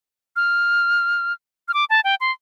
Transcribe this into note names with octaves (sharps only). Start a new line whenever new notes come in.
F6
F6
D6
A5
G5
C6